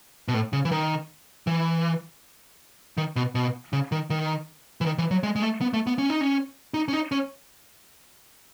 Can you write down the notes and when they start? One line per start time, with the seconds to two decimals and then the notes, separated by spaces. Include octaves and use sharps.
0.28 B2
0.34 A2
0.53 C#3
0.65 E3
0.71 D#3
1.47 E3
2.97 D#3
3.16 B2
3.35 B2
3.73 C#3
3.92 D#3
4.10 D#3
4.81 E3
4.86 D#3
4.98 E3
5.11 F#3
5.23 G#3
5.36 G#3
5.42 A3
5.61 B3
5.74 A3
5.87 B3
5.99 C#4
6.10 D#4
6.21 C#4
6.74 D#4
6.88 C#4
6.93 D#4
7.12 C#4